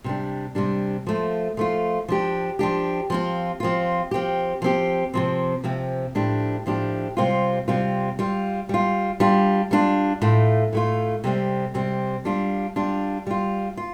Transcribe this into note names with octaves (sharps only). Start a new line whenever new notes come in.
C3 G3 D4
C3 G3 D4
F3 A3 F4
F3 A3 F4
F3 D4 G4
F3 D4 G4
F3 C4 F4
F3 C4 F4
F3 C4 G4
F3 C4 G4
C3 F3 C4
C3 F3 C4
A2 F3 D4 G4
A2 F3 D4 G4
C3 G3 C4 F4
C3 G3 C4 F4
G3 F4
G3 F4
G3 D4 F4
G3 D4 F4
A2 A3 F4
A2 A3 F4
C3 G3 C4
C3 G3 C4
G3 D4 F4
G3 D4 F4
G3 F4
F4